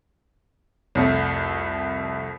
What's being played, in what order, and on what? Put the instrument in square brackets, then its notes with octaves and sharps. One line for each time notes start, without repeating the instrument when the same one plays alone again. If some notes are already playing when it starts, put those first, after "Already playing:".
[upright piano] C2 F2 A3